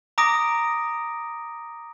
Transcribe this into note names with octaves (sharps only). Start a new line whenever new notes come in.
A#5 D6 D#6 A#6 D7